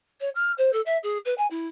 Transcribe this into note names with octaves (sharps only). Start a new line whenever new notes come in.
C#5
F6
C5
A4
E5
G#4
B4
G#5
E4